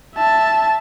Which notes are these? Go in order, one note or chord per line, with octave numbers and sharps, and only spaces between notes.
E5 A5